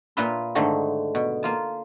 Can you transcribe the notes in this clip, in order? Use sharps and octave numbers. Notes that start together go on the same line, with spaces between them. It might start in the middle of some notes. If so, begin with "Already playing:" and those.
A#2 A#3 F4 B4 E5 C6
G#2 D3 D#3 A3
B2
A#3 F4 A5